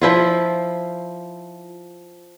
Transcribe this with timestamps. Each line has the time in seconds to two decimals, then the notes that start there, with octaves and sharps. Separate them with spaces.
0.01 F3 E4 F4